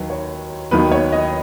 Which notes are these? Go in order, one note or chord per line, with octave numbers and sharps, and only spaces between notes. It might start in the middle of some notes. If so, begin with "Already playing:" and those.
Already playing: D#2 D#3 F#3 B4
C#5
D#2 D#3 F#3 B3 B4
C#5
D#5